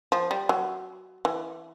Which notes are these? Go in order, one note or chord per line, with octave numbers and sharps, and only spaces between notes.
F3
G3
F#3
E3